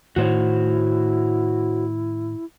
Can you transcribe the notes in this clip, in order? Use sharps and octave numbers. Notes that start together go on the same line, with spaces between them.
A2 D#3 E4 F#4 C5 C#5